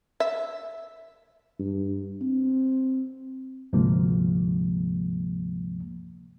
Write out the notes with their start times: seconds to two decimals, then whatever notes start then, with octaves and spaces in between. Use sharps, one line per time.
0.20 E5
1.59 G2
2.21 C4
3.73 D2 G#2 C3 F3 G#3 A#3